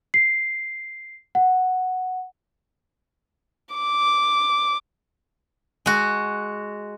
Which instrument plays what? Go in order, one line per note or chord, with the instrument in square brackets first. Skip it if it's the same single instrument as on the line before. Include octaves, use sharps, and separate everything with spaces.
[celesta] C7
F#5
[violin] D6
[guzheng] G#3 F#4